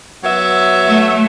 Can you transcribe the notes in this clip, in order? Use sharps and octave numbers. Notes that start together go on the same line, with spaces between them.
F#3 B3 E5
A3